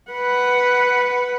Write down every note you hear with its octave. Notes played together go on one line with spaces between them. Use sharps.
B4 F#5